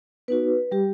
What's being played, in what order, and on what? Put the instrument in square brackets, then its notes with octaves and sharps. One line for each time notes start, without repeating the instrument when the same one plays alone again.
[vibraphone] B3 D#4 F#4 B4
G3 G4